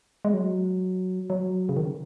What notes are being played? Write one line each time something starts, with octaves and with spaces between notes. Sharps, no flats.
G#3
F#3
F#3
C#3
D#3